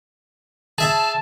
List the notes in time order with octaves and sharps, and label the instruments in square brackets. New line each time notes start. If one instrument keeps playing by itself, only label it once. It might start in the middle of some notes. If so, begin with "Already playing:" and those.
[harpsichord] G#4 E5 G#5 [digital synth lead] A5